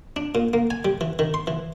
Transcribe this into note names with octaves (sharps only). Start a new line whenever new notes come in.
D4
A#2
A#3
G#5
G3
E3
D#3
C6
E3